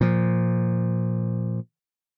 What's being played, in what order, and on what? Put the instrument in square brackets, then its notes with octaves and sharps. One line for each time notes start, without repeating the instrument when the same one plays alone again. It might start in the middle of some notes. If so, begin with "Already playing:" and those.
[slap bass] A#2 F3